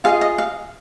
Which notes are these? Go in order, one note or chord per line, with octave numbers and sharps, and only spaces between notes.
F4 G#4 D#5 F5
D#5
F5